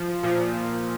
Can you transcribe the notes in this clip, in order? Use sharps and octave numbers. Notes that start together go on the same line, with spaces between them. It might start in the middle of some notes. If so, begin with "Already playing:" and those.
Already playing: F3
A#2 F3